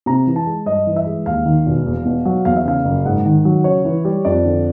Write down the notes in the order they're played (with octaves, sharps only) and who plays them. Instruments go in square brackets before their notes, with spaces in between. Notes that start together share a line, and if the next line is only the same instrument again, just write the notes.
[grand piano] C3 A#5
E3
A5
G#3
G2 D#5
E3
E5
G#3
D#2 F5
D#3
E1
E2
B2
F#3
E2 F5
E5
C#3 F5
F#1
G#2 F#5
D#3
F#3
C#3 C#5
E3
G3
F2 D5
D3